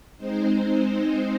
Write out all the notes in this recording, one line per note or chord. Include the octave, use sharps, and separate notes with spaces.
G#3 C4 D#4 C5